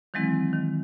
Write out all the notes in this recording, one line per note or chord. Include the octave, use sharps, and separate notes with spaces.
D#3 E3 F#3 G#3 C4 E4
D#3